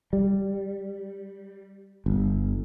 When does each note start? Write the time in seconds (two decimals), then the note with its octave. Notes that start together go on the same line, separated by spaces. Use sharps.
0.13 G3
2.06 G1